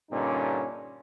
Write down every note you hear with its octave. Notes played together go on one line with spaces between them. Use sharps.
G2 A#2 D3 C#4 D#4